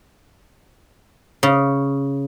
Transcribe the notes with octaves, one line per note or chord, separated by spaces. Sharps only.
C#3